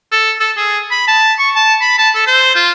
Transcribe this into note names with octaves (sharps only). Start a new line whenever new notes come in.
A4
A4
G#4
B5
A5
C#6
A5
B5
A5
A4
C5
F4